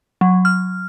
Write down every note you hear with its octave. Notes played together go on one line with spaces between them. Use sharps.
F#3
F6